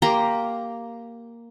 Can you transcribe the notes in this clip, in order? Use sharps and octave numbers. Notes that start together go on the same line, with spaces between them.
A#3 G4 A#5 C6